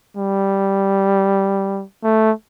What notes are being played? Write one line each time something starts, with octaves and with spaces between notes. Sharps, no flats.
G3
A3